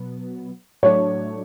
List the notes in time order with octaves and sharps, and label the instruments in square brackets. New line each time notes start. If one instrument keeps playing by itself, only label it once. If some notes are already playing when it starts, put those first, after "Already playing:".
Already playing: [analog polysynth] B2 F#3 B3
[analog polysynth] A2 F#3 A3 D4 [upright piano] C#5